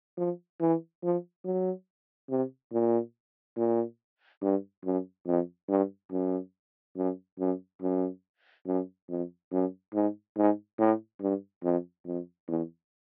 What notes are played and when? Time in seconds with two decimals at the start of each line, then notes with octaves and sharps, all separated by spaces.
0.17 F3
0.61 E3
1.03 F3
1.45 F#3
2.30 C3
2.73 A#2
3.57 A#2
4.42 G2
4.85 F#2
5.27 F2
5.69 G2
6.12 F#2
6.97 F#2
7.39 F#2
7.82 F#2
8.67 F#2
9.09 F2
9.52 F#2
9.94 G#2
10.37 G#2
10.79 A2
11.21 G2
11.63 F2
12.06 F2
12.48 E2